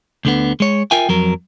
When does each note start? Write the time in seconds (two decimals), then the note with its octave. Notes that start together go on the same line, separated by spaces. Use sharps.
0.25 D2 D3 B3
0.60 G#3 C#5
0.91 F4 A#4 E5 G5 G#5
1.09 F2 F#3 A#4